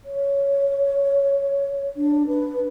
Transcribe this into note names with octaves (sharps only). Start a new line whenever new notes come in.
C#5
D4
B4